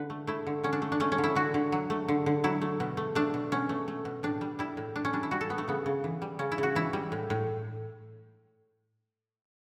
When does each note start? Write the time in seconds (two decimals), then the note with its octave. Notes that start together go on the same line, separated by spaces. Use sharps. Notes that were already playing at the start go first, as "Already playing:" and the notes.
Already playing: D3 B4
0.10 A3
0.27 A3 E4
0.47 D3
0.64 D3 C#4
0.73 D4
0.82 A3
0.92 D4
1.00 A3 C#4
1.12 C#4
1.18 D3
1.24 E4
1.35 D3 F#4
1.54 D3
1.72 F#3
1.90 A3
2.08 D3
2.26 D3
2.44 F#3 E4
2.62 A3
2.80 B2
2.97 A3
3.15 A3 D4
3.34 B2
3.52 B2 C#4
3.69 A3
3.88 A3
4.05 B2
4.23 A2 D4
4.41 G3
4.59 G3 E4
4.77 A2
4.96 A2 D4
5.05 C#4
5.13 G3 D4
5.23 E4
5.31 G3 F#4
5.41 A4
5.49 A2 B3
5.58 A3
5.68 C#3 B3
5.86 C#3
6.04 E3
6.22 G3
6.39 C#3 C#4
6.52 E4
6.58 C#3 F#4
6.75 E3 E4
6.93 G3
7.12 A2
7.30 A2